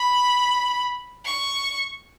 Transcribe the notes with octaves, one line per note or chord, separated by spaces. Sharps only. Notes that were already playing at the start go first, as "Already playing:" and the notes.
Already playing: B5
C#6